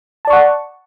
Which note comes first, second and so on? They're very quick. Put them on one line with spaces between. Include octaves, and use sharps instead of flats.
A5 D5 C#6 F#5